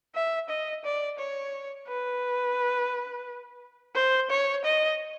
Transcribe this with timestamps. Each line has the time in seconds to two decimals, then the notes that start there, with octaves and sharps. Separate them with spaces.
0.15 E5
0.49 D#5
0.84 D5
1.18 C#5
1.87 B4
3.95 C5
4.30 C#5
4.64 D#5